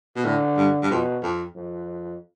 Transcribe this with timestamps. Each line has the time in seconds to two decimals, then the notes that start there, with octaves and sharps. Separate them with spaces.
0.16 B2
0.24 A2 D3
0.57 G2
0.82 G2
0.90 F2 B2
1.23 F2
1.55 F2